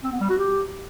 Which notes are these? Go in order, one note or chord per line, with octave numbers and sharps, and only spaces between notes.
C4
B3
G3
F#4
G4